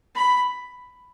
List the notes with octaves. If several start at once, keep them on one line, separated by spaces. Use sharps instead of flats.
B5